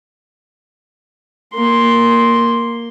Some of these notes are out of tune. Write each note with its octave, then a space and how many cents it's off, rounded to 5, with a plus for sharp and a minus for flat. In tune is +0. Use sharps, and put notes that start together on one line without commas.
A#3 +0 C6 +0